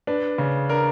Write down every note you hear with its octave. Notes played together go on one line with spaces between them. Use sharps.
D4 B4
C#3
D4 A#4